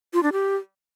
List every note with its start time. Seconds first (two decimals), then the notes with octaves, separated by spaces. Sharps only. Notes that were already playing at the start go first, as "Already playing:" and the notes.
0.13 F4
0.23 D4
0.32 G4